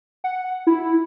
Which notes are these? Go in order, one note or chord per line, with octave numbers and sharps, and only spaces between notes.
F#5
E4